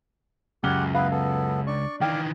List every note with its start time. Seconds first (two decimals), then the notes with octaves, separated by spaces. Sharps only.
0.64 C#2 F#2 G4 F#5 F6 G7
0.94 B3 E4 B4 F5
1.11 B3 A4
1.67 D4 D5 C#6
2.01 D#3 E3 F5 G5 D6